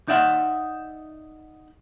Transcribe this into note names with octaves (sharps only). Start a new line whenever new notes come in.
D#4 D5 E5 F#5